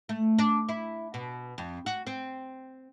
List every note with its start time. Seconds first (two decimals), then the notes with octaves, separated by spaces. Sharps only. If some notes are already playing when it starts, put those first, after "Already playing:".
0.09 A3
0.38 D4
0.69 E4
1.14 B2
1.58 F2
1.86 F#4
2.07 C4